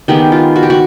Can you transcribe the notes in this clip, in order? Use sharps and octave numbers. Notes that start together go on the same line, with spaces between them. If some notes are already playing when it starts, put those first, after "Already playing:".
D#3 G#3 B3 G4
F4
F#4
G4
F#4